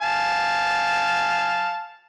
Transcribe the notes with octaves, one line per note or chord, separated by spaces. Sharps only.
F5 G#5 A5